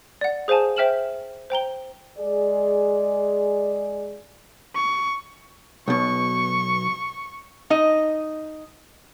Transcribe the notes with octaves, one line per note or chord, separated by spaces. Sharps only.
D5 F#5
G#4 C5 F5 G#5 A5
C5 E5 G5 F6 E7 F#7
C5 G5 A#5 G7
G#3 G#4 D5
C#6
B1 B2 C#6
D#4 D#5